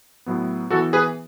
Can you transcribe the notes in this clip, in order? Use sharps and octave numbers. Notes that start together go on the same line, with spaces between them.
A2 F#3 B3
E3 B3 F#4 A4
G#4 B4